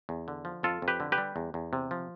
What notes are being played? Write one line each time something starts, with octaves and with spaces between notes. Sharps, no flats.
E2
D3
F3
F2 F4 A4
F2
G4 B4
D3
G4 B4
G3
E2
E2
C3
F3